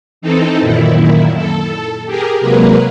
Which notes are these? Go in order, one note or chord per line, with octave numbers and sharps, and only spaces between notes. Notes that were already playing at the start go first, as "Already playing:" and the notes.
E3 C4 D#4 A4
F#2 A#2 D#3 E4
A4
G4 G#4 A#4
C3 F#3 G#3 A#3 A#4 B4